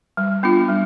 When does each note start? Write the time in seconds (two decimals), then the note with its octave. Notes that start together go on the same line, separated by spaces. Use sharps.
0.17 G3
0.43 B3 D4 F4
0.68 G3